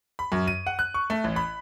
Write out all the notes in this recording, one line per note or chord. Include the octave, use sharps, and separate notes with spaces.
B5
F#2
D#7
F#5
F#6
C#6
A3
A1
B5